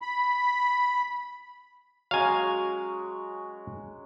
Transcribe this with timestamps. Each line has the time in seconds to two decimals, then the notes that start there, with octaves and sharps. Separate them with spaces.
0.02 B5
2.11 F#3 G#3 C#4 F5 G#5